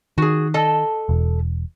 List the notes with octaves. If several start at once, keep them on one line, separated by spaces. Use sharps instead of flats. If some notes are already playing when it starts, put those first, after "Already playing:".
D#3 F#4 G#4
A4 D#5 A5
E1